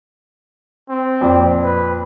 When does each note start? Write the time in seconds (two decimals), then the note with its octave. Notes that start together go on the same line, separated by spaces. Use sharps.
0.89 C4
1.21 F2 A#2 D5
1.64 B4